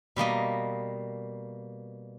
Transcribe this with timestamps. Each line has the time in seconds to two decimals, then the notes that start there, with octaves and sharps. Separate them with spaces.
0.16 B2 G3 A#3 D#5